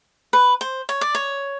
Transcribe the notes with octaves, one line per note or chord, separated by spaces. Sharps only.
B4
C5
C#5
D5
C#5